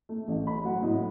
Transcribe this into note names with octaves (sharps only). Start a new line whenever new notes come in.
A3
A1
A3 B5
F#3 F#5
A2 D#5